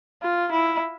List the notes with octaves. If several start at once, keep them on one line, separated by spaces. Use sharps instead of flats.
F4
E4